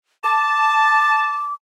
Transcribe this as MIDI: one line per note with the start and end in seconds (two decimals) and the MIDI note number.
0.24 1.44 81
0.24 1.54 86